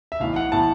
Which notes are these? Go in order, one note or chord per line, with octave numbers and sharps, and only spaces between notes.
E5
B1 A2 E3 F5
F#5
A2 E3 A5